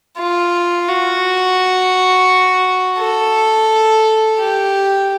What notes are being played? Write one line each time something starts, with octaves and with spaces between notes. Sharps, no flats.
F4
F#4
A4
G4